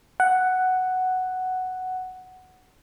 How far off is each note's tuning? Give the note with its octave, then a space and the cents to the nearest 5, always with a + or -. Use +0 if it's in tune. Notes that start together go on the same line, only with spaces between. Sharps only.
F#5 +5